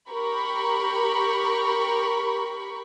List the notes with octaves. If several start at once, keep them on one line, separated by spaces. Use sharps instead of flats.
G4 A#4 B5 C#6